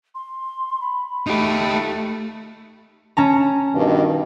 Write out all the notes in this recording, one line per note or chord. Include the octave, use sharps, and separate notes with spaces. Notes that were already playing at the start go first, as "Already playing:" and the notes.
C6
B5
A3 D#4 G4
C#4 A5 A#5
G2 B2 D#3